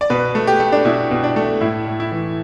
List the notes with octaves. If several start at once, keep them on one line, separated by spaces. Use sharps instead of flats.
D5
B2 B4
A3
G4
A3
D4
B2 E4
B2
D4
A3
A2 E4
A2
E4
E3